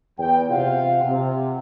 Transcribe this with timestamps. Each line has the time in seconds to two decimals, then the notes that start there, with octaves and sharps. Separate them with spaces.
0.18 E2 G5
0.49 C3 F4 F5 F#5
1.04 C3